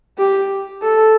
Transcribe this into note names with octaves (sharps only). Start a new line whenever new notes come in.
G4
A4